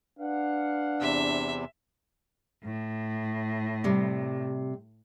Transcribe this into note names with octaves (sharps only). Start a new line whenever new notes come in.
D4 B4 F5 F#5
E2 C3 E5
A2
C3 G3